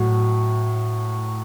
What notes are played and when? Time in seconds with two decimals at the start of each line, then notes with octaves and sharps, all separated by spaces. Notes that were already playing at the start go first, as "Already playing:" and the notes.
Already playing: A2 F#3